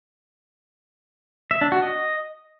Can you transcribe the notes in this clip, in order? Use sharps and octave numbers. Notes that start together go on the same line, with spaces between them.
E5
D4
F#4
D#5